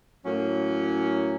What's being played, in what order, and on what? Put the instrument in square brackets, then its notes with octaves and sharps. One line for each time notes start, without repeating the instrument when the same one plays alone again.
[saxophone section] A2 F#3 A#3 C#4